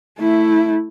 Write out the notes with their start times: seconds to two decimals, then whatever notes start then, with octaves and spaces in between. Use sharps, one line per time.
0.19 A3 E4